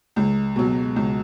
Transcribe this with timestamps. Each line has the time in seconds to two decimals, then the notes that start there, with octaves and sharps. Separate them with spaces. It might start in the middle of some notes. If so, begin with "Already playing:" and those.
0.16 C#2
0.56 B2 F#3
0.96 C#2